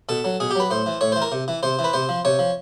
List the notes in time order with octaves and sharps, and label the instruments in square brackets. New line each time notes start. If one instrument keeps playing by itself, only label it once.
[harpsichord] B2 A4
F#3
B2 G#4
G4
F#3 B4
A2 C5
E3
A2 C#5
E3 C5
A#4
C3
E3
C3 C5
E3
B4
C3 C5
F3
C3 C#5
F3